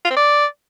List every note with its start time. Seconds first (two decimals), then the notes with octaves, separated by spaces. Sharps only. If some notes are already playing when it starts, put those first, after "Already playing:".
0.05 F4
0.11 C4
0.16 D5